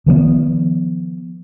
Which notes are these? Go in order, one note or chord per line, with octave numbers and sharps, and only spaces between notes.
D#3 F3 G#3 B3